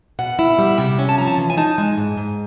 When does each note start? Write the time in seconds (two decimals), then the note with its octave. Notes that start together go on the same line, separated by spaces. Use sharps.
0.19 B2 F#5
0.39 E4
0.59 G3
0.78 C3 G5
0.99 C#4
1.09 A5
1.18 F3 A#5
1.28 A5
1.38 E3
1.50 G#5
1.57 D#4 A5
1.78 G#3 G#5
1.97 G#2
2.17 G#2